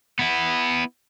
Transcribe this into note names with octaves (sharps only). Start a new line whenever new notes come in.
B3 E4